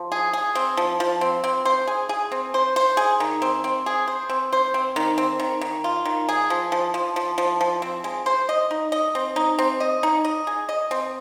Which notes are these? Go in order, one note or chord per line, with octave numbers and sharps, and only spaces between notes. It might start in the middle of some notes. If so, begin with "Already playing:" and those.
Already playing: F3
G#4
G#4
C4
F3
F3
C4
C4
C5
G#4
G#4
C4
C5
C5
G#4
D#3
C4
C4
G#4
C5
C4
C5
C4
D#3
C4
D#3
D#3
F4
D#3
G#4
F3
F3
F3
F3
F3
F3
C4
G#3
C5
D#5
D#4
D#5
C4
D#4
C4
D#5
D#4
D#5
G#4
D#5
C4